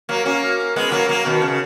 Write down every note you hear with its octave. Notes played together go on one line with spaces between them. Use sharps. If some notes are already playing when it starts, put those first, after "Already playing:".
F#3 A#3
A#3 C#4
G#3 B3
F#3 A#3
F#3 A#3
B2 D#3
C#3